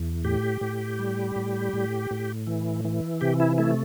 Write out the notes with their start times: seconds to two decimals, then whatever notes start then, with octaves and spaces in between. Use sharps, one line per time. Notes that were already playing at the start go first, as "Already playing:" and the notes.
Already playing: E2
0.24 A2 G4
0.61 A2
0.99 G3
1.36 A2
1.73 A2
2.11 A2
2.47 E3
2.85 E3
3.21 C3 G4
3.40 E4
3.58 A3 E4